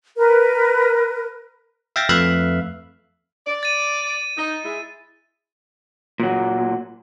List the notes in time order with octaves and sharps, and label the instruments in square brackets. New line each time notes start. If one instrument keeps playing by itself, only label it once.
[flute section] A#4 B4
[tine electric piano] E5 F5 G5 A6 A#6
F2 A3 B4 E5 F5 F#6
[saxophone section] D5
[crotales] A6 D#7
[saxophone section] D#4
G#3 E4
[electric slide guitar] A#2 F#3